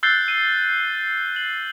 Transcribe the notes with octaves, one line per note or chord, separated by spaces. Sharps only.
E6 F#6 G6 A6 C7 G7
D#7
F#7